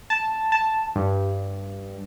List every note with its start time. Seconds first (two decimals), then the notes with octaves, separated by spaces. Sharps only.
0.10 A5
0.52 A5
0.96 G2